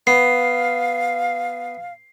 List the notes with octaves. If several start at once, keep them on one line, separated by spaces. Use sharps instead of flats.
B3 F5 C7